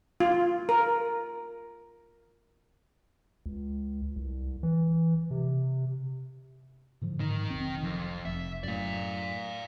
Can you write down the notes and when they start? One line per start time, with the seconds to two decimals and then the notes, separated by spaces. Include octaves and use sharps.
0.20 F4
0.69 A#4
3.46 C#2
4.16 C2
4.63 E3
5.31 C3
7.01 A2 D3 F3
7.20 G#2 D#3 D#4
7.50 F1 B1 C4
7.83 F2
8.25 F1 E5
8.63 F#2 A2 D5 F5